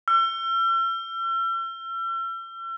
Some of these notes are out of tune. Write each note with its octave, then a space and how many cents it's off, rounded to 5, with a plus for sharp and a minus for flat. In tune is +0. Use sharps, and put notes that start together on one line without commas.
E6 +45